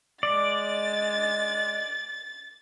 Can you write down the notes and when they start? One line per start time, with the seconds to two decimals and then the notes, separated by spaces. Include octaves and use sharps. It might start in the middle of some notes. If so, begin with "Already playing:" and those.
0.23 G#3 D5 A6